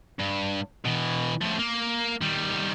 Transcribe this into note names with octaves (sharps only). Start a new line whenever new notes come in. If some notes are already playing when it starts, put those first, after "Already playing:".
G2
B2 E3
A2 F3
A#3
D#3 G3